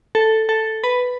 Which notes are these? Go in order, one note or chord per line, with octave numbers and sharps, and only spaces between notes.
A4
A4
B4